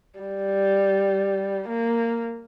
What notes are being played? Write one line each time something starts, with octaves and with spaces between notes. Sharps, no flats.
G3
A#3